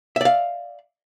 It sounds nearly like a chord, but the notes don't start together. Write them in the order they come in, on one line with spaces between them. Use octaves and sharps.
E5 D5 F5